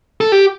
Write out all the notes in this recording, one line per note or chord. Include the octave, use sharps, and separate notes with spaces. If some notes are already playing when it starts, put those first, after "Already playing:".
A4
G4